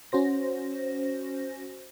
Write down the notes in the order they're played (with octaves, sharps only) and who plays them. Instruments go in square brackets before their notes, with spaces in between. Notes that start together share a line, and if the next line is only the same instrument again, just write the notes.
[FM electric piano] C#4 F#4 C5 A#6